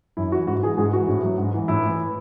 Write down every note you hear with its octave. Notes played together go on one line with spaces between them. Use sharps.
F#2 E4
E3 F#4
G#2 F#4
E3 G#4
G#2 G#4
E3 F#4
A2
F#3
G#2
E3
A2 E4
E3